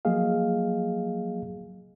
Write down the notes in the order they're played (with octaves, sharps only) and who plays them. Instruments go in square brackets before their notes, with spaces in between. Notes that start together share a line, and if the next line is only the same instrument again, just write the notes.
[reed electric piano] F3 F#3 A#3 G#4 D#5 F5